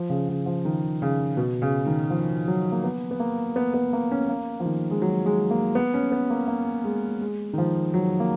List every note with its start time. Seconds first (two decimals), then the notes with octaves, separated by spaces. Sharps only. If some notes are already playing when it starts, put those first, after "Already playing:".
Already playing: F3
0.10 C#3
0.29 C#3
0.46 F3
0.65 D#3
1.02 C#3
1.37 B2
1.62 C#3
1.86 D#3
2.10 F3
2.48 F#3
2.72 A#3
2.84 B3
3.11 B3
3.20 A#3
3.56 B3
3.74 B3
3.93 A#3
4.11 C#4
4.29 A#3
4.60 F3
4.65 D#3
4.91 G#3
5.02 F#3
5.26 G#3
5.51 A#3
5.75 B3
5.94 C#4
6.12 B3
6.30 A#3
6.48 A#3
6.84 G#3
7.21 G#3
7.53 D#3
7.58 F3
7.94 F#3
8.20 A#3